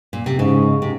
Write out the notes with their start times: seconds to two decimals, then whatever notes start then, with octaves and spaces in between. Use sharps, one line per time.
0.13 A#2
0.26 C3
0.39 G#2 C#3
0.82 C3